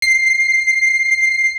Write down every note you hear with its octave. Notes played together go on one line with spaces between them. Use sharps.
C7